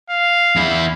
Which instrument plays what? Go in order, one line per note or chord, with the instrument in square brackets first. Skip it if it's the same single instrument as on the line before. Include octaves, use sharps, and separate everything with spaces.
[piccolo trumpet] F5
[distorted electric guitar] E2 E4